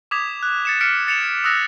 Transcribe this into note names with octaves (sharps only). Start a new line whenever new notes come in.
D6 D#6 G#6 B6 F7
F#6
A6 C#7 E7
F6 B6 C#7 D7
A6 C#7 E7 F7
D#6 E6 F#6 A#6